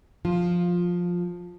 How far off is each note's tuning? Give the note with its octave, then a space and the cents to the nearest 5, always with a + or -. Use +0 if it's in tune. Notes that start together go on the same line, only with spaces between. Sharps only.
F3 +10 F4 +0